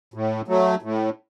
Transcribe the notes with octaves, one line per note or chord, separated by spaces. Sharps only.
A2
F#3 A3
A2